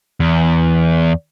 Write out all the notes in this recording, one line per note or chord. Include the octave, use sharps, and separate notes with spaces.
E2